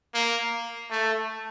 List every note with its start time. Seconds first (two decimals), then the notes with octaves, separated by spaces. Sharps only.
0.14 A#3
0.90 A3